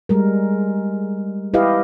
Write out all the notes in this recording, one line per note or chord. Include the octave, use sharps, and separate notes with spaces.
G3 G#3 A#4
E4 G4 B4 D#5 F5